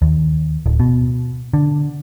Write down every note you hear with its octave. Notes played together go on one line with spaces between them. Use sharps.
D#2
D1
B2
D3